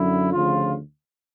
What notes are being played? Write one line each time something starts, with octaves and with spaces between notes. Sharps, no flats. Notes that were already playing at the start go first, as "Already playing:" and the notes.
Already playing: F#2 D3 F#3 E4
D2 C#3 F3 F4